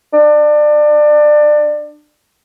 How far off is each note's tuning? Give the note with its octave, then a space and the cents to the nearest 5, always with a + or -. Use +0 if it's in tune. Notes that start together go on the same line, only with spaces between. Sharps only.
D4 +25